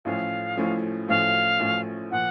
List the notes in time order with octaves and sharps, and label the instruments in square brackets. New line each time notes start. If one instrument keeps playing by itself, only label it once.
[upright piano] A1 A2 F3 A3 C#4 [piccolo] F5
[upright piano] A1 A2 F3 A3 C#4
[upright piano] A1 A2 F3 A3 C#4 [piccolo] F5
[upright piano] A1 A2 F3 A3 C#4
[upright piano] A#2 F3 [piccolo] F#5